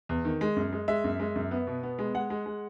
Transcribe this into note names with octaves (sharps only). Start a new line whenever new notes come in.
E2
D#3
G#3
F#2
G#3
G#3 E5
F#2
G#3
F#2
B3
B2
B3
G#3
G#3 F#5
G#3
G#3